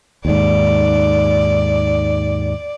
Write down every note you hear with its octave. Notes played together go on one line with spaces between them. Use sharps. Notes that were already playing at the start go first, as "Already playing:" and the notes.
D#2 G#2 D5